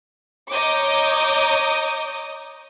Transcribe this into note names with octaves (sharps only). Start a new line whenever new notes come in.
C#5 D#5 A#5 D6 D#6 G6